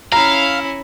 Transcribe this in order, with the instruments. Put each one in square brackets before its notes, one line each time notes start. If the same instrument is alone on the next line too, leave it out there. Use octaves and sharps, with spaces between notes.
[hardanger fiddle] C#4 E4 [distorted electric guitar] F5 [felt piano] A#5